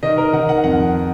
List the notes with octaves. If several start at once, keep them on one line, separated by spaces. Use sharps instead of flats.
D#3 D#5
A#4
D#3 F#5
F#5
F2 F#5